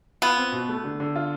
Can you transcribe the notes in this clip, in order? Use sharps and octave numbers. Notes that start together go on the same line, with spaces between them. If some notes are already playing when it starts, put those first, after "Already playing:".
B3 F4
C4
B2
A3
D3
D3
F4